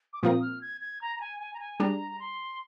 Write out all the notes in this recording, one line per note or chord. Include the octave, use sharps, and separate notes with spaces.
D6
A#2 F3 C4 F4 A#4 D#6
F6
G#6
G#6
A#5
A#5
G#5
G#5
A#5
G#5
G3 D4 G#4 A#5
C6